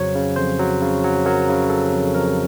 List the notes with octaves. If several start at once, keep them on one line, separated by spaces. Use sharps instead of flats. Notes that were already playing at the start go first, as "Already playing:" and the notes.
Already playing: F2 C#3 F#3 C5 C#5
C#3
F2 C5
F#3
C#3
F#3
F#3 A#4
C#3
F#3 A4
F2
F2 A#4